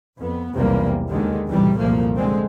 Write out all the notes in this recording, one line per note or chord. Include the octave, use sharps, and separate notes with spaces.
F2 B3
B1 E2 C3 G3 A#3
D#2 D3 D#3 G#3
B1 F2 A2 C3 E3 G3
F#1 C2 A#2 F3 A3 A#3
D3 G#3 C4